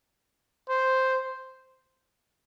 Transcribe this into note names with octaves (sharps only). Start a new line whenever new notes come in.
C5